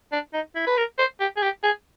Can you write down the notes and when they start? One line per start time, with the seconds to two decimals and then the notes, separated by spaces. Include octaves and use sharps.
0.12 D4
0.33 D#4
0.56 E4
0.67 B4
0.77 A#4
0.98 C5
1.20 G4
1.37 G#4
1.43 G4
1.64 G#4